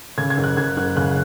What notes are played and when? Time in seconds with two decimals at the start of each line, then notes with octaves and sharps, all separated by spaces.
0.18 C#3 G#6
0.30 G#6
0.38 F#1
0.44 F#6
0.57 F#1 G#6
0.77 F#1 F#6
0.96 C#3 F#6